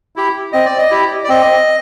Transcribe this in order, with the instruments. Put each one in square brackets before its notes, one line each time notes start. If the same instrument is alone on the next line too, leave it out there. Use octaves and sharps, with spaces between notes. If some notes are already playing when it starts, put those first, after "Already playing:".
[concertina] E4 G4
C4 D#5
D5
D#5
E4 G4
D5
C4 D#5